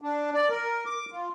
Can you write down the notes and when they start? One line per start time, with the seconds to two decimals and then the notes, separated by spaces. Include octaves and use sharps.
0.02 D4
0.34 D5
0.50 A#4
0.86 D6
1.11 F4